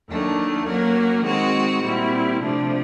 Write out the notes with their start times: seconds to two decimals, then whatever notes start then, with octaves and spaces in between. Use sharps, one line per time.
0.09 D#2 D#3 F#3 A3 D4
0.67 F#3 A#3 C#4 F#4 A#4
1.25 D#3 G#3 C4 D#4 F#4
1.83 A#2 G3 C4 E4
2.41 C3 F3 A3 D4